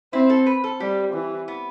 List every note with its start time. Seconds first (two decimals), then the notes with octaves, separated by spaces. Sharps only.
0.13 C4 E4
0.30 A4
0.46 B4
0.64 A4
0.80 G3 G4
1.14 E3
1.48 B3